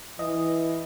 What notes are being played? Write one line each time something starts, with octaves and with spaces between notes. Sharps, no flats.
E3 D#5